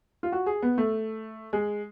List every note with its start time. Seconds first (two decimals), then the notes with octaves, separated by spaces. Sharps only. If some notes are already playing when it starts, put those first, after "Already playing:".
0.23 F4
0.32 F#4
0.46 G#4
0.62 B3
0.78 A3
1.53 G#3